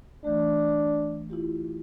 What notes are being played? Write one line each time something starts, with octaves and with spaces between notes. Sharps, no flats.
E3 A3 D4
E4 F4 G4